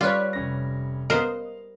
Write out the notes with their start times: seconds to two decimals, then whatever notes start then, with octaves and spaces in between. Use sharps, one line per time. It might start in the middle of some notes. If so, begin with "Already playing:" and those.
0.01 G3 F4 B4 C#5 D5 F5
0.33 F1 C#4 A#6
1.10 B3 A#4 C5 D#5 F5